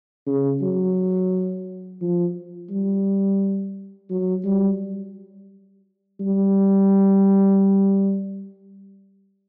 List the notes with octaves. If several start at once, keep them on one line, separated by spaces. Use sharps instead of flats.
C#3
F#3
F3
G3
F#3
G3
G3